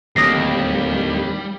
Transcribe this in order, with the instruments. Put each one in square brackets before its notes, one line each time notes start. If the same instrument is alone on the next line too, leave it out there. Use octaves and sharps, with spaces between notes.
[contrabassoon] D1 [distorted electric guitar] D#2 [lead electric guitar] G3 [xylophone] D#6 A#6 C7